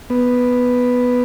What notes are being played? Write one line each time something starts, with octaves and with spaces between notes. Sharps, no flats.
B3